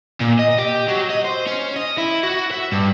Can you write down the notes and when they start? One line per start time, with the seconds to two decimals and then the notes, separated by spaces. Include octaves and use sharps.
0.21 A#2
0.39 D#5
0.58 G4
0.88 F#3
1.10 D#5
1.24 C5
1.47 C#4
1.76 D#5
1.98 E4
2.23 F#4
2.51 E5
2.72 G2